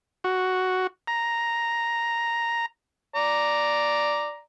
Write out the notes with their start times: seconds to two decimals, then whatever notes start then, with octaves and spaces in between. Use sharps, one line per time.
0.24 F#4
1.08 A#5
3.15 D5 A#5